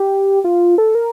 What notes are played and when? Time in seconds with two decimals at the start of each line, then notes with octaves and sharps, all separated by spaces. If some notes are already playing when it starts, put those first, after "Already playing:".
Already playing: G4
0.44 F4
0.78 A4
0.95 A#4